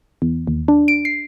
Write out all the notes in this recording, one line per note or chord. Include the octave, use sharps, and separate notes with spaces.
E2
D#2
D4
D7
C7